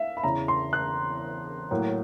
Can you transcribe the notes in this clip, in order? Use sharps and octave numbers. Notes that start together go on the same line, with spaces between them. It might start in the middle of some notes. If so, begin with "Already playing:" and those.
Already playing: E5 F5
B5
E2 C#3 E3 A#5
C6
F#6
A2 F#3 A#3